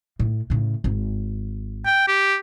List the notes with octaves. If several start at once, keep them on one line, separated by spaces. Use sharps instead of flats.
A2
A2 C#3
G#1
G5
G4